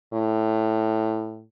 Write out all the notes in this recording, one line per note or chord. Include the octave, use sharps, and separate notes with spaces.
A2